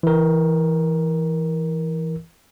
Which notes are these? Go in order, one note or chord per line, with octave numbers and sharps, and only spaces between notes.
E3 A#4